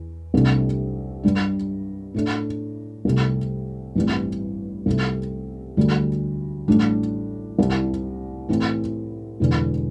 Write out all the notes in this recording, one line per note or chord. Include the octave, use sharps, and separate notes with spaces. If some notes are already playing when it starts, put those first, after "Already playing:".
Already playing: E2
C2 C3 A3 D4
G2 G3 D4
A2 A3 D4
C2 C3 A3
A1 G2 E3 G3 C4
C2 C3 A3 C4
D2 D3 G3
A1 A2 G3 D4
C2 C3 G3 C4 E4
A2 E3 C4 E4
E1 E2 D3